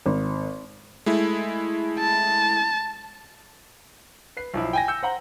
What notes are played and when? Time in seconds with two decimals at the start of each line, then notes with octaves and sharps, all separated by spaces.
0.06 G#1
1.06 G#3 A3 E4
1.99 A5
4.37 B4 C7
4.54 B1 F3 E4
4.73 G5 G#5 A#6
4.88 E6 G6 C#7
5.03 C5 F#5 A#5